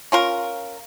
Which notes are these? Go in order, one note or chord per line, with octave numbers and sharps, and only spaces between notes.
C#4 F4 A#4